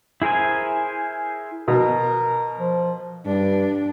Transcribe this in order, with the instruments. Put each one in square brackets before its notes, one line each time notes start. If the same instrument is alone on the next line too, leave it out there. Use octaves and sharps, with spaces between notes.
[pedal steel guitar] E4 G#4 A#4 C5 G#5
[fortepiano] B2 [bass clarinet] A#4
[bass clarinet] F3
[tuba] G2 [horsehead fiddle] D4